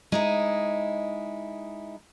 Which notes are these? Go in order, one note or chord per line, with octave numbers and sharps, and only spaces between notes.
G#3 D#4 E4